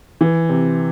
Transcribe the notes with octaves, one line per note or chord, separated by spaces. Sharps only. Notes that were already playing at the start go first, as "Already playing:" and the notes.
E3
C3